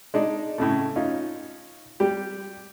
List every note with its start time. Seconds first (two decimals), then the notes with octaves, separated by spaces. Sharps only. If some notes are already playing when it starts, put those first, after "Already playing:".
0.14 G#3 D4 D#4
0.58 A2 C#3 A3
0.96 C#4 D#4 F4
2.00 G3 G4